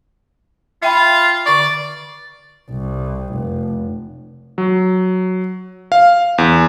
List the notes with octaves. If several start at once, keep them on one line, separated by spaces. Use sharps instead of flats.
F4 E5 G5 B5
D3 D5 C#6
C2
F1
F#3
F5
E2